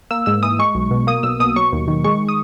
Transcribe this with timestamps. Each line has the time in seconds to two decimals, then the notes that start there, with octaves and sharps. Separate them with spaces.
0.11 A#3 E6
0.26 G#2 E6
0.43 E3 D#6
0.59 G#3 C#6
0.75 B1
0.91 B2
1.07 A#3 D#6
1.23 B1 E6
1.40 B2 D#6
1.56 F#3 C#6
1.72 D#2
1.88 D#3
2.04 G#3 C#6
2.29 D#6